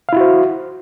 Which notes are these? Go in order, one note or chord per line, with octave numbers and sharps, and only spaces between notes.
E4 F#4 C5 F5